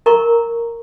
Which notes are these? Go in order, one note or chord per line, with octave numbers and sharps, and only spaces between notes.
A#4 A#5 C#6